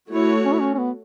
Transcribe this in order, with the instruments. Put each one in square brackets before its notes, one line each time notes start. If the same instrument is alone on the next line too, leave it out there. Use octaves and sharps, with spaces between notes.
[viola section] A3 F#4 C#5 [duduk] E4
[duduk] C#4
E4
C#4
C#4
B3